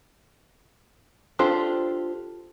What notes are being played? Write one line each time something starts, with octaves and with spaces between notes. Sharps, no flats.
D4 F4 G4 A4 C5